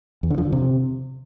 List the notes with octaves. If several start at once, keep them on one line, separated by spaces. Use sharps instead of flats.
E2
D3
F3
D3
C3